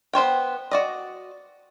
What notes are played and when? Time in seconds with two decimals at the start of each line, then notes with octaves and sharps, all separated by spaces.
0.13 B3 C5 C#5 G5
0.71 F#4 D5 D#5